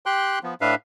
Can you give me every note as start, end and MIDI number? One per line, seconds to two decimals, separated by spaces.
0.06 0.39 67
0.06 0.39 79
0.06 0.39 84
0.06 0.39 90
0.43 0.54 53
0.43 0.54 59
0.61 0.75 45
0.61 0.75 62
0.61 0.75 71
0.61 0.75 76
0.61 0.75 77